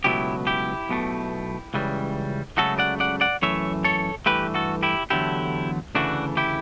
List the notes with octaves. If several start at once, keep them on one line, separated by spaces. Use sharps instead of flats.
C#2 B2 F#3 A3 E4 G4
E4 G4
B1 B2 A3
C#2 C#3 E3 G3
C#2 C#3 F#3 A3 F#4 A4
D5 F#5
D5 F#5
D5 F#5
F#2 E3 A3 C#5 E5
A4 C#5
G2 E3 A3 G4 B4
F#4 A4
E4 G4
E2 D3 F#3 A3 E4 G4
D2 C#3 E3 A3 D4 F#4
E4 G4